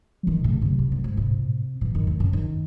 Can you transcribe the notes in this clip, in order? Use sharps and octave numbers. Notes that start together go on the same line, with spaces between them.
F#3
D#3 E3
A2 C3
C#3
F#2 A2 C3
E2
F#2
G#2
C3
A2
A2 E3
F#2 D#3
E2 A2
F#2 C#3
D#3